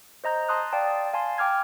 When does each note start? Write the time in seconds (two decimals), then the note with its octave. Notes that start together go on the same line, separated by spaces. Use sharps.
0.24 C5 D#5 A#5 G6
0.49 A5 C6 D#6 F#6
0.73 D5 F5 G5 A5
1.13 F5 G#5 A5 C6
1.38 G5 D6 F6 G#6